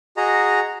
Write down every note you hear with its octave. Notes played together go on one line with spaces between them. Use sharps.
F#4 G#4 D#5 A#5